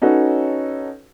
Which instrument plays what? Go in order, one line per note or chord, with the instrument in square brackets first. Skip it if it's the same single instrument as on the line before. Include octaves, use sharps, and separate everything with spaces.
[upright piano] C#4 D#4 F#4 A4 B4 C#5